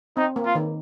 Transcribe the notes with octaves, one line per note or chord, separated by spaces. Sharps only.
C4 D#4
A#3
F4
D#3